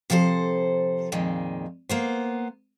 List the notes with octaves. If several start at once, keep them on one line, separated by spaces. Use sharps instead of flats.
C3 F3 A4 A#4 C5
F2 A#2 D#3 G#3
A#3 B3 C5